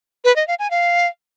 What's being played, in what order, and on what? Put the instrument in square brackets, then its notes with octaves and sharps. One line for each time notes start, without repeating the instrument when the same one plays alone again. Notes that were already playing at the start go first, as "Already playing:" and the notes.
[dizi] B4
D#5
F5
G#5
F5